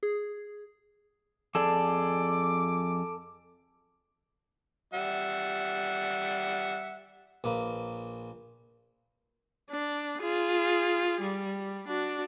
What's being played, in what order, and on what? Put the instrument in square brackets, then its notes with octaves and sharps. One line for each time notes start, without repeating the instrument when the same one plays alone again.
[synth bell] G#4
[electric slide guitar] F2 G#4 D5 [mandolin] A4 [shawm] D6
[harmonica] G3 E5 F#5
[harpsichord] A#1 A#3 B4
[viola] D4
F4 G#4
G3
D4 F#4